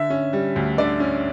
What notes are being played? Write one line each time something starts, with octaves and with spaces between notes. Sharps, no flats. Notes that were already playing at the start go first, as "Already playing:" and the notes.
Already playing: D3 E5
C#4
G3
D2
D3 D5
C#4